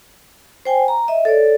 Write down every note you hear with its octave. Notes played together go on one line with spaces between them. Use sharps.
C5 G5 G#5
A#5
D#5 E5
A4 C#5 D5